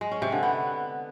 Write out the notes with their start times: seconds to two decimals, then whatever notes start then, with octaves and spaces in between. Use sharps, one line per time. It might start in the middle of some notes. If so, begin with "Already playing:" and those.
0.01 G#3
0.11 C#4
0.22 C3
0.32 D3
0.43 B3